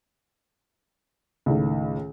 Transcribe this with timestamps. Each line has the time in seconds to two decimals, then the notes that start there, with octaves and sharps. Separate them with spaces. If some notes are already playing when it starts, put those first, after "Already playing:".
1.46 C#2 A2 D#3